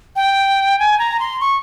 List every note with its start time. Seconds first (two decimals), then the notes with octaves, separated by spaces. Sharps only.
0.16 G5
0.79 G#5
0.99 A#5
1.20 C6
1.40 C#6